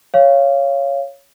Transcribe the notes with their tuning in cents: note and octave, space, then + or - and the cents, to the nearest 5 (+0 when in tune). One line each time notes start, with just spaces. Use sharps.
C#5 +0 F5 -15